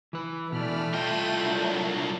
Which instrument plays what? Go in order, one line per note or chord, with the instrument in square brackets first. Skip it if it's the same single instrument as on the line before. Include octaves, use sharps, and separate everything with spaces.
[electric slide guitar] E3 B4
[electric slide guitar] B2 E3 [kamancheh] A3 [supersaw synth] D5 B5 F6
[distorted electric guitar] C2 G5 [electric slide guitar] F4 D#5 [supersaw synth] D#7
[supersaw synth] F#3 D4 A#4